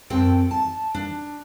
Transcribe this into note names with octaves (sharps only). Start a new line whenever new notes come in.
F#2 C4 A4 G5
A5
D4